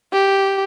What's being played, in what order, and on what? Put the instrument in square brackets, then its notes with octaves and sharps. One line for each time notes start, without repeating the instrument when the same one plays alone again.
[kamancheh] G4